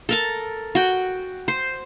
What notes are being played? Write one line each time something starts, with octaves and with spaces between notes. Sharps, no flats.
A4 A#4 A5
F#4 G5
C5